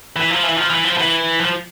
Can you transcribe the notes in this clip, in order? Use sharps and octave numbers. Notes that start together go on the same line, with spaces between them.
E3
F3
E3
F3
E3
F3
E3
F3